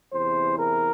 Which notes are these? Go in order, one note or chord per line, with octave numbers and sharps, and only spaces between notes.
E2 C3 E3 C5
A#4